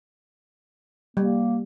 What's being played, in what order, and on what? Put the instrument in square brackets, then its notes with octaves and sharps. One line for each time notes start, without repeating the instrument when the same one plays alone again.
[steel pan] G3 [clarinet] A#3